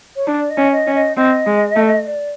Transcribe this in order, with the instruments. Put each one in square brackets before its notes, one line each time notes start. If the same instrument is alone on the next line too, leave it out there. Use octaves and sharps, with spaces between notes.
[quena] C#5
[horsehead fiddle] D4 [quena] D5
[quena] D#5
[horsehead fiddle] C#4
[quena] D#5
[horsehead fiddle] C#4
[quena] D#5
[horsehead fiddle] C4 [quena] D#5
[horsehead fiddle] G#3
A3
[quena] D5